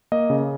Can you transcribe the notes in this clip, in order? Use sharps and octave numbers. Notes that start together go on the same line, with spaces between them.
A#3 D#5
C#3